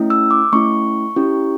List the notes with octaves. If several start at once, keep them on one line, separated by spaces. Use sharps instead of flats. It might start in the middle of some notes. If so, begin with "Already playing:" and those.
Already playing: A3 C#4 E4
E6
D6
A3 C#4 E4 C#6
C#4 E4 G4